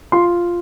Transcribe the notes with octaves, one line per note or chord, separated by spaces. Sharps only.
F4 C6